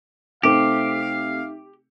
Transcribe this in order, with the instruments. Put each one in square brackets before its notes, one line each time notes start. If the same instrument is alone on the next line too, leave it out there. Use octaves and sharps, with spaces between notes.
[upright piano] C3 A3 C4 [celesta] D#4 E5 D6 [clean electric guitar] G4 [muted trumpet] F5